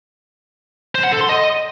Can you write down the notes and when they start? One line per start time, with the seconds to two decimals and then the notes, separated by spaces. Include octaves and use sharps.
0.95 C5
1.04 F#5
1.12 A4
1.21 C6
1.29 D#5